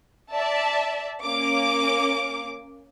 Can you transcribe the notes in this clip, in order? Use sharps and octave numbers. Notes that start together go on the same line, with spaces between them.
D5 E5 A5
A#3 C#4 D6